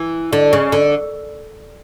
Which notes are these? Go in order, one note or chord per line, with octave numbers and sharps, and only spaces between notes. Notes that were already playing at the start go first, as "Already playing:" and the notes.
Already playing: E3
D3
C#3
D3